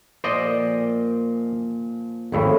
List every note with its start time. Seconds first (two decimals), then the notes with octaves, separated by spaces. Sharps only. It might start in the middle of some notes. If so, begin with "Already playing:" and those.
0.24 A#2 F3 C5 D5 D#5
2.32 G#1 F2 A2 A3 E4